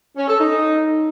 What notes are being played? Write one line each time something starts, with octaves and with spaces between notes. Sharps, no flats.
C#4
A4
D#4